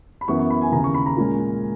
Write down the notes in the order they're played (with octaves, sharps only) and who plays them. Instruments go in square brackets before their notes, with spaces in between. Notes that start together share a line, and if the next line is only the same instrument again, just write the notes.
[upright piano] B5
F#2 E3 B3 E4 C#6
C#6
B5
G#5
D#2 C#3 E3 A#5
C#6
B5
A#5
A#2 G#3 C#4